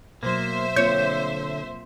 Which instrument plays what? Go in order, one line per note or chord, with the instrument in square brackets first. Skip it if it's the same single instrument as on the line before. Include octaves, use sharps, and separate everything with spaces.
[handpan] B2 F#3 [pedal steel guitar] A#3 [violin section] C5 E5
[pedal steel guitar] D3 G6 [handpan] A#3 C4 F4 [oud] C#5